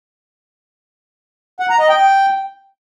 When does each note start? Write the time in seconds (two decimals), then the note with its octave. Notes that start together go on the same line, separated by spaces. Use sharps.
1.60 F#5
1.70 A#5
1.79 D#5
1.89 G5